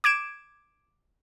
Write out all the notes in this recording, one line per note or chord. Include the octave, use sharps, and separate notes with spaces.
D6 G#6 D7 E7